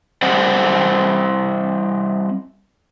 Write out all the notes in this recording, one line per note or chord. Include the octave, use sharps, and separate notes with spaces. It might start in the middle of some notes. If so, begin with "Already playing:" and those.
G3 C4 C5 D5 D#5 F#5